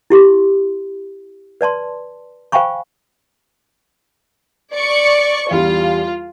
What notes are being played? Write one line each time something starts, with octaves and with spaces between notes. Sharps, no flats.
E4 G4 C6
B4 D5 A5 C6
C5 F5 G5 G#5 B5 C#6
D5 C#6 C#7
E2 G3 F4